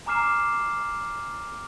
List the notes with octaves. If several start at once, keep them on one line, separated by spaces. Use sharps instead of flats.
G#5 A#5 D6 F6 C7 E7